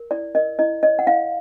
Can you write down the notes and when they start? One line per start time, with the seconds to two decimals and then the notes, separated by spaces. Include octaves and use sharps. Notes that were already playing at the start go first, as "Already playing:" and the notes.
Already playing: A#4
0.11 E4 D5
0.35 A#4 D#5
0.59 E4 D#5
0.83 C#5 D#5
0.99 F#5
1.07 E4 F5